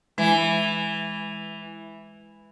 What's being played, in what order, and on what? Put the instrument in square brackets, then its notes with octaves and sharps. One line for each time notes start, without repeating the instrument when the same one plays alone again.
[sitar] E3 [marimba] G#3